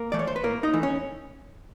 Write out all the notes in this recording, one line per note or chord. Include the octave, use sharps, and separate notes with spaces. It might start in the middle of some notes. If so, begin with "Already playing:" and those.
Already playing: A#3 A#4
E3 A3 D5
C#5
C5
B4
A2 A#3 A#4
D#4 D#5
E3 A3
C#4 C#5